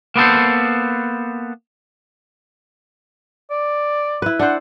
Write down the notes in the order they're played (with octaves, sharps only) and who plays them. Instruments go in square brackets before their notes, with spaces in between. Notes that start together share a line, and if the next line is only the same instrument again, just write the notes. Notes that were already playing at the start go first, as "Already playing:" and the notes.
[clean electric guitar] A#3 B3 A4 C5
[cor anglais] D5
[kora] E4 B4
[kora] D4 C5 [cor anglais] F#5